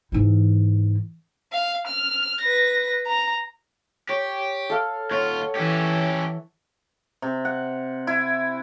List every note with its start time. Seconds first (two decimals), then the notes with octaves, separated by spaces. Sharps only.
0.12 G#2 E3
1.53 F5
1.87 F6
2.41 B4 A#6
3.07 A#5
4.09 G4 C#5
4.70 A4 F5
5.11 D#2 F4 C#5 F#5
5.56 E3 C#4 G4
7.22 C3
7.45 F#5
8.07 E4